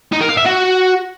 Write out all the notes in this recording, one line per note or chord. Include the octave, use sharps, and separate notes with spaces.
D#4
A#4
F5
E5
F#4